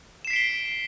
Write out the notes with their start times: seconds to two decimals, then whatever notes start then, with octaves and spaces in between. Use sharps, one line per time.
0.25 E7
0.27 C7
0.30 B6
0.33 D7
0.36 G7